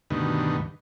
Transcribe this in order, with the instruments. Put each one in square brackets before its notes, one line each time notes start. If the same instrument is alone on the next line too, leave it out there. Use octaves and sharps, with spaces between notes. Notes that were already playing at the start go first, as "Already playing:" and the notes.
[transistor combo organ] D2 G2 B2 D#3